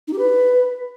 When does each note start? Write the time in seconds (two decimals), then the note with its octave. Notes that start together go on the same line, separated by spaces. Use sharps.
0.08 D#4
0.13 G4
0.19 B4